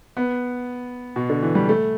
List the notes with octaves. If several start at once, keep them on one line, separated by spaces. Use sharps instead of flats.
B3
B2
D3
E3
G3
A3